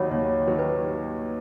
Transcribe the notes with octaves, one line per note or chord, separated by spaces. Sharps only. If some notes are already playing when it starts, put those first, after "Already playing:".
Already playing: D#2 D#3 F#3 C#5 F#5 B5
D#2 C#5
D#3 F#3
B4